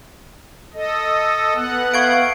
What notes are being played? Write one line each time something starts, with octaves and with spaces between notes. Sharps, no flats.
A4 D#5
B3 F#5
A4 E5 F5 C#6 G#6 D7